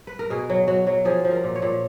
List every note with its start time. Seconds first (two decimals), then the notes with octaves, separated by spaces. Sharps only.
0.07 B4
0.19 A#4
0.30 B2 G#4
0.50 F#3
0.68 F#3 F#4
0.87 F#3
1.05 F3 G#4
1.25 F3
1.31 A#4
1.44 A#2
1.55 C#5
1.62 A#2